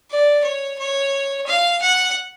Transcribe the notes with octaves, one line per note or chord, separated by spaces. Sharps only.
D5
C#5
C#5
F5
F#5